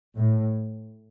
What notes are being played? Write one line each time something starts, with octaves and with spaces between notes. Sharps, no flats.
A2